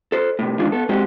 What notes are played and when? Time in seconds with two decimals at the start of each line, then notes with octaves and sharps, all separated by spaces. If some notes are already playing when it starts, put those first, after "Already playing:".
0.12 A4 C5
0.39 A2 C3
0.59 G#2 D#3 E3 G#3 D4 F4
0.72 B3 A4
0.89 G#3 C4 F#4 G4